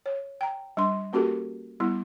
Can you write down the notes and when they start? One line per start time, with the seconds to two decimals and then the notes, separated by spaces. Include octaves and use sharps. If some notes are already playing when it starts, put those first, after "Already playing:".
0.06 C#5
0.41 G5 A#5
0.77 G3 D4 C6
1.13 A#3 C#4 F#4 G4 A4 A#4
1.80 G3 B3 E4